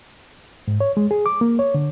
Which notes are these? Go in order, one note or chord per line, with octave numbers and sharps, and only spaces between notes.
G#2
C#5
G#3
G#4
D6
A#3
C#5
D3